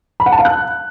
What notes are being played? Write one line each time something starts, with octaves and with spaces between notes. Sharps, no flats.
B5
F#5
A5
F5
F#6